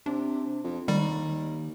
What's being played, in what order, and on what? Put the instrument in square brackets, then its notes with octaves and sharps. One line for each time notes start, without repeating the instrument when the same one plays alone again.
[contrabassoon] C3 [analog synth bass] D4
[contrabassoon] F2
[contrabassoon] D#2 [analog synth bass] D#3 [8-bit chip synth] G3